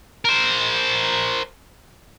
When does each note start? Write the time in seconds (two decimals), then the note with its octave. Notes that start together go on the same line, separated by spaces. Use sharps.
0.25 A#4 C5